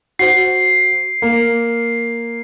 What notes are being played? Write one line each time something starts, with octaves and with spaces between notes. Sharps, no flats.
F#4 C5 C7
A#3